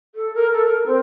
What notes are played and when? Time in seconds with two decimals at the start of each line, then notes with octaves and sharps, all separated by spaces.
0.15 A4
0.34 A#4
0.52 A4
0.65 A#4
0.86 C4